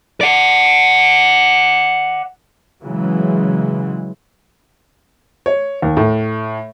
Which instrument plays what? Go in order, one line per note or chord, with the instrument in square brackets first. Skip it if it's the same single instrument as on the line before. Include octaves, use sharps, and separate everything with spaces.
[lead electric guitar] D5 F#5
[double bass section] C#3 E3 F#3 G#3
[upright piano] C#5
D#2
A2